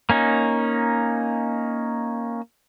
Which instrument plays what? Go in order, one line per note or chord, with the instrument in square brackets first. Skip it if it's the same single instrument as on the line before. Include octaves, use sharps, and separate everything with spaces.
[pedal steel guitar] A#3 C#4 D#4